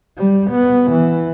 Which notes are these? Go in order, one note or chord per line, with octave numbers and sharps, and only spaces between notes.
G3
B3
E3